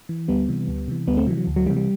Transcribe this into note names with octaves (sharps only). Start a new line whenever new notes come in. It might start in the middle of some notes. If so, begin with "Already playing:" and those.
E3
D2 G3 B3
C3 E3
D2
C3 E3
D2 G3 B3
A3 C4
C3 E3 F#3
F#3
D2
F#3
C3 E3 G3
G3